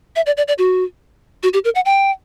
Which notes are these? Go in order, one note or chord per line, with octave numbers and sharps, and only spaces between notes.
E5
D5
D5
D5
F#4
F#4
G4
A#4
F#5
G5